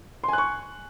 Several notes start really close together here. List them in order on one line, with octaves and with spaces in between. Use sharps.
C6 G#5 F#6 C#6